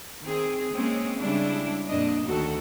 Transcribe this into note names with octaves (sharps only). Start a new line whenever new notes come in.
D#3 C4 G#4
G#3 A#3 C4 C#4 G#4
C#3 G3 G#3 D4 E4
F2 A#2 D4 D#5
D2 D#3 F#4 A4